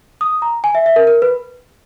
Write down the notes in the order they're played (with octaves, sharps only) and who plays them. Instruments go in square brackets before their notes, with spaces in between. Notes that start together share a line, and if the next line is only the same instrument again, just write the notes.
[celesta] D#6
A#5
G#5
E5
E5
A#4
A#4
B4